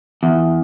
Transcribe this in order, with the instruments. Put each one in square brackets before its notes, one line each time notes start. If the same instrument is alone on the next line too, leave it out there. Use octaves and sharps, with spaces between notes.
[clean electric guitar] E2